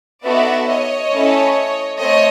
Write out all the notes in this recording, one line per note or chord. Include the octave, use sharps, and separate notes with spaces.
B3 D#4 F#4 A4 D5 E5
C#5 D#5
A3 C#4 E4 A4
A3 C4 C#5 D#5